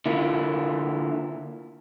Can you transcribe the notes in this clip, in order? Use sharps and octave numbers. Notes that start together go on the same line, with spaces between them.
D3 A#3 E4 F4